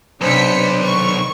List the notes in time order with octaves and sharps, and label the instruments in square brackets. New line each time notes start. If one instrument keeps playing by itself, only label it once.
[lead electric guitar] B1 [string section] C3 B6 C#7 [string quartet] D4 B4 C5
[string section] D#3 C#6